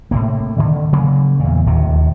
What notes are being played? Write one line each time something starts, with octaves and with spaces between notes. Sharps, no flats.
A2 C3 A#3
D3 D#3
C#3 F#3 A#3
E2 A#2
D1 D#2 A2 C3